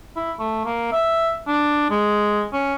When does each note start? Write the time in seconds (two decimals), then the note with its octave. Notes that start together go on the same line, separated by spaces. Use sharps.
0.16 E4
0.39 A3
0.65 A#3
0.92 E5
1.47 D4
1.90 G#3
2.53 C#4